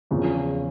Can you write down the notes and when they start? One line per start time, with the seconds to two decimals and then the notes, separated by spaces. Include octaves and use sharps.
0.11 E2 C#3 F3